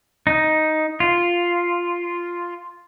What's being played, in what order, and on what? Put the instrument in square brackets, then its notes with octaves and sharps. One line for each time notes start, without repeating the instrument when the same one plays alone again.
[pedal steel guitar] D#4
F4